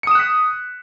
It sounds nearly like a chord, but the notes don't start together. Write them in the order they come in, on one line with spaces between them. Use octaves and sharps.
C#7 D#6 E7 F#6 B6